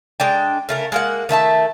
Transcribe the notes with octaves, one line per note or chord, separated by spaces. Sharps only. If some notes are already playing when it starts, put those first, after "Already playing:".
G#3 D4 G5
C#3 A3 A#4
G#3 A#3 F#5
D#3 A3 E5 A5